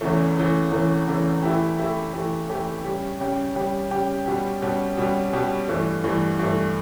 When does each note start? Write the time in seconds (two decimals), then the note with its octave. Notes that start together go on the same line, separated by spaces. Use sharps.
0.01 E2 C#3 E3 A3
0.37 E2 C#3 E3 A3
0.71 E2 C#3 E3 A3
1.08 E2 C#3 E3 A3
1.43 E3 A3 E4 G4
1.78 E3 A3 E4 G4
2.13 E3 A3 E4 G4
2.49 E3 A3 E4 G4
2.84 C#3 G3 C#4 G4
3.20 C#3 G3 C#4 G4
3.55 C#3 G3 C#4 G4
3.91 C#3 G3 C#4 G4
4.26 B2 G3 C#4 G4
4.62 B2 G3 C#4 G4
4.97 B2 G3 C#4 G4
5.33 B2 G3 C#4 G4
5.69 G2 E3 A3
6.04 G2 E3 A3
6.39 G2 E3 A3